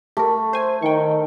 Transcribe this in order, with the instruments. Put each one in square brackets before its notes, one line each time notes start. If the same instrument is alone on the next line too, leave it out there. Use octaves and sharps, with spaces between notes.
[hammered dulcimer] A3 [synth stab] G4 A#4
[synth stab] C5 G#5
[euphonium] D#3 [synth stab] G5 C#6